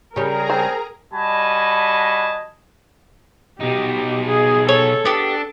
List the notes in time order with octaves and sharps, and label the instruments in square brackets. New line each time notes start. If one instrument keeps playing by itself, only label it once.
[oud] C#3 G3 [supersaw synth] G#4 A#5 [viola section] A#4
[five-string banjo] C4
[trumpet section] G3 F#4 D#5 G#5 A5 B5
[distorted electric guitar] B2 D#4 [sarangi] G4
[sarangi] G#4
[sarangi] A4 [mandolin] C#5
[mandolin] B3 G4 [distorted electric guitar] D4